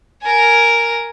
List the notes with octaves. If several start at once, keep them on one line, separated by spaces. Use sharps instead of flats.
A#4 G#5